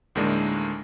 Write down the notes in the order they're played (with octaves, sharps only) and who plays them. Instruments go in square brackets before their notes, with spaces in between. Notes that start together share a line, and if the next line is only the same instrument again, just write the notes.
[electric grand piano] D2 A2 D#3 G#3 A#3 D4